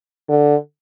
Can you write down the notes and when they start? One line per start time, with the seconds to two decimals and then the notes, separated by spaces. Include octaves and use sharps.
0.29 D3